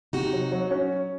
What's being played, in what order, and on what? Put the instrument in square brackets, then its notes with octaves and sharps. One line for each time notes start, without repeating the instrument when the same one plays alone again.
[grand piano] C3 [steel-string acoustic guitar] D#4 F#4
[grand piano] F#3
F#3
C#4